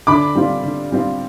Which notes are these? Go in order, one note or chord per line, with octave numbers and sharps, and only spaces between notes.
D3 B5 D6
G3 C4 F4
D3
G3 C4 F4